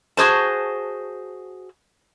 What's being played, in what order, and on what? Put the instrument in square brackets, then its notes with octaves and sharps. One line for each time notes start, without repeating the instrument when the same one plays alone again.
[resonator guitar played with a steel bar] F#4 G#4 C5 A5